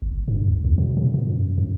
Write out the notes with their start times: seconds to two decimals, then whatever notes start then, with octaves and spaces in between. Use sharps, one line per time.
0.02 F#1
0.28 G2
0.48 C#2
0.64 E2
0.78 B2
0.97 C3
1.14 A#2
1.27 F#2
1.58 F#2